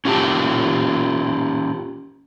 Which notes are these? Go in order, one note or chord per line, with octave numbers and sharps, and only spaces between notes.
C#4 F4 G4 A#4 G5 A5